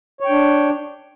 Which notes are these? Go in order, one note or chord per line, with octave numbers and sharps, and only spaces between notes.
D4 C#5 G5